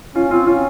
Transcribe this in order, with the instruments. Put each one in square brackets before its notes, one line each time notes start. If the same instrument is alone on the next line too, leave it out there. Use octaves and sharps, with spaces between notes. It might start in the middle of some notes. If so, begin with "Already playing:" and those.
[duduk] C#4 [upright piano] F4
[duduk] C4 [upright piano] F4
[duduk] C#4 [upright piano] F4